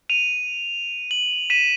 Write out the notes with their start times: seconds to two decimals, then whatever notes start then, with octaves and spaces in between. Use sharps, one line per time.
0.09 D#7 F7
1.11 F#7
1.50 B6 D#7 E7